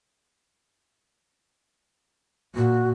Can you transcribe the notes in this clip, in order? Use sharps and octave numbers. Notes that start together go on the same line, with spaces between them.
A#2 F#4